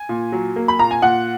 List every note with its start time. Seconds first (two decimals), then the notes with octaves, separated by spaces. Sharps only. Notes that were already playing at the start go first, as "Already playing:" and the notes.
Already playing: G#5
0.09 A#2
0.32 F#3
0.56 A#3
0.68 B5
0.79 A#2 A#5
0.91 G#5
1.02 A#2 F#5